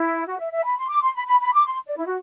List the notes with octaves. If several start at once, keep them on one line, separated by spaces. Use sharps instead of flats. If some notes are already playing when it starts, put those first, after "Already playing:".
Already playing: E4
F#4
E5
E5
B5
C6
D6
C6
B5
B5
B5
D6
C6
D5
E4
F#4